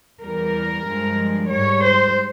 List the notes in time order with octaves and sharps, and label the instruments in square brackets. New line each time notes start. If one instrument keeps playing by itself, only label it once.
[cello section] E2 E3 G3 A#4
G2 F3 G#3
G#2 G3 C#5
C5